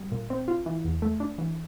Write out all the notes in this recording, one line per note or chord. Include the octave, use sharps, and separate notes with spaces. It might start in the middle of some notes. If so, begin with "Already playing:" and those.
Already playing: G3
A#2
C4
F4
E3
E2
A3
D4
E3